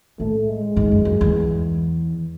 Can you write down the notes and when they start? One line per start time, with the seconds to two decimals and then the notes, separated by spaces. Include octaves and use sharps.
0.20 A2 A3
0.48 G#3
0.76 G#2
0.92 F#2
1.05 F#2
1.21 E2